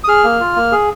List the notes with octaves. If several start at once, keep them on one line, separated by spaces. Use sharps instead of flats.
D#6
G#4 F6
A#3
F4
A#3
G#4